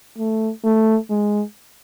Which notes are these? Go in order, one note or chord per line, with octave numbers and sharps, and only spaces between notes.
A3
A3
G#3